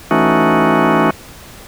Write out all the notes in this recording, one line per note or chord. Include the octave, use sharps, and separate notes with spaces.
E3 A3 C#4 D#4 F#4